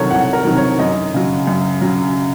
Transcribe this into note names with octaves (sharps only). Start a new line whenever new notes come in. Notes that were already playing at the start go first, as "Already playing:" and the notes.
Already playing: C2 C3 D#3 F#3 A4 A#4 C#5
C2 F#5
A#4
C3 D#3 F#3
C#5
F#2 D#5
C#3 F#3
F#2
C#3 F#3